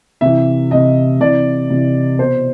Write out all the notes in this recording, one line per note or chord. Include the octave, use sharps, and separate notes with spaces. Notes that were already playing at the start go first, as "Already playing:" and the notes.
C3 E3 E5
C3 E3 D#5
C3 E3 D5
C3 E3
B2 C5